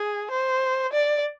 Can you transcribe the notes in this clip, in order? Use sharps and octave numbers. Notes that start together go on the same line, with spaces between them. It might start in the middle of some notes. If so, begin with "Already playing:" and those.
Already playing: G#4
C5
D5